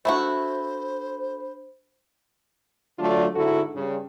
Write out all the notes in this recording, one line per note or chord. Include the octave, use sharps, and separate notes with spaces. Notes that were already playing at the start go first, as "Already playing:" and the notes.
A3 D4 E4 F#4 C5 B5
D3 F#3 A3 D4 F4 D5
G#2 D3 E4 F#4 A4
G2 C#3